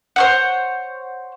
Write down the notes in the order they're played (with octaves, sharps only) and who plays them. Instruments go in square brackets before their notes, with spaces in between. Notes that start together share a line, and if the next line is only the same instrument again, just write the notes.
[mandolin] C5 C#5 F#5